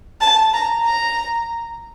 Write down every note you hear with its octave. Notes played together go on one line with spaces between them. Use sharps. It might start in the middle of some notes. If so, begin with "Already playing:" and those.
A5
A#5
A#5